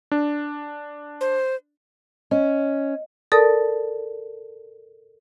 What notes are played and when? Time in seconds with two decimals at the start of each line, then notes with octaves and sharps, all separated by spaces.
0.12 D4
1.21 C5
2.31 C#4 D#5
3.32 A4 A#4 D5 A5 D#6